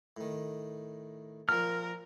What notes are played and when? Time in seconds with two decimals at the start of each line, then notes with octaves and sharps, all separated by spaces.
0.17 A2 D#3
1.49 A#2 F3 A#4 F6